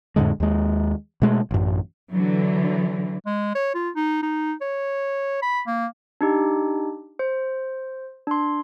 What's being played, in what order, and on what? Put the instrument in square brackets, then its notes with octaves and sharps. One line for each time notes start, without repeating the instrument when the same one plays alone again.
[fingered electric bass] F2 A2 D3 G#3
D#2 G#3
B2 G#3 A3
A1 F#2
[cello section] D3 E3 F#3
[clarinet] G#3
C#5
F4
D#4
D#4
C#5
B5
A#3
[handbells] D4 D#4 G4
C5
D4 C6